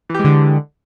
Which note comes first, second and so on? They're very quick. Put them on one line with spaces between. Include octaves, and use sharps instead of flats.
E3 G4 G#3 D3